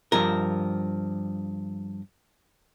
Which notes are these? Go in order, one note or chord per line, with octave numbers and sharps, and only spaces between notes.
G2 F3 A#4